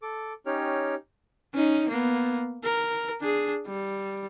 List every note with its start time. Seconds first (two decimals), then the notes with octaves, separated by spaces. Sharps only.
0.02 A4 D6
0.46 C#4 D#4 G4 C#5 G5 F6
1.54 C#4 D#4
1.89 A#3 B3
2.64 A#4
3.21 D4 G#4
3.67 G3